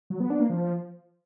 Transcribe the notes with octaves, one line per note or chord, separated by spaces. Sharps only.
F#3
B3
D4
A#3
F3